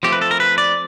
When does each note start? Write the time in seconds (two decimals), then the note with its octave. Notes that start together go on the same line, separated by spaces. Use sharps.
0.03 F3 A3 C4 G4
0.12 B4
0.21 A4
0.31 A#4
0.40 B4
0.58 D5